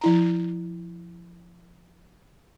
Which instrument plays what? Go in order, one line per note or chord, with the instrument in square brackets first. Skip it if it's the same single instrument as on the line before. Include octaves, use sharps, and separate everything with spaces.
[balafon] F3 E4 A#5